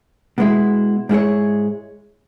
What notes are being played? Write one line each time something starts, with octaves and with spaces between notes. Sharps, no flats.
B2 G#3 E4
G#2 G#3 E4 G#4 C#5